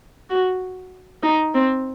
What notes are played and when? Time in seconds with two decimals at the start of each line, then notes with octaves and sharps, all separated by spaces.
0.30 F#4
1.23 D#4
1.54 C4